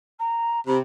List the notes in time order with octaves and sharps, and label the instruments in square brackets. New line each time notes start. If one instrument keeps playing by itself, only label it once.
[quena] A#5
[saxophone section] C3 [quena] B5